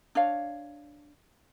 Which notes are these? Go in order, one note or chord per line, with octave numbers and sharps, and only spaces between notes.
D4 C#5 F5